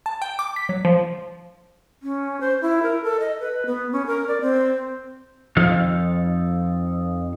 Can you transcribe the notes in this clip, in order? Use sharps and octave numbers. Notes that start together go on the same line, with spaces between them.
A5
G5
D6
B6
F#3
F3
C#4
C5
E4
A#4
A4
D#5
B4
B3
C#4
A#4
D5
C4
F2 F3 D#4 A4 F5